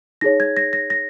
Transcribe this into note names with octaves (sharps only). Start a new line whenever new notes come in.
D#4 G#4 C#5 A#6
G#6
A#6
A#6
A#6